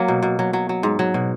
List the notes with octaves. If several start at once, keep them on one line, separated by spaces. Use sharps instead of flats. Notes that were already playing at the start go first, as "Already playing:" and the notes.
Already playing: F#3 A#3
B2
B2
F#3
F#3
F#3
G#2
F#3
B2